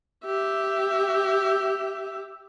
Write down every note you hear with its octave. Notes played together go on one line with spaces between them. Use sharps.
G4 E5